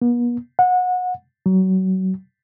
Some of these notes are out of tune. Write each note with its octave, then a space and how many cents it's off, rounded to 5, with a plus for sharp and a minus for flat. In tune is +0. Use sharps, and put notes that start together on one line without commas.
B3 -45
F#5 -25
F#3 +25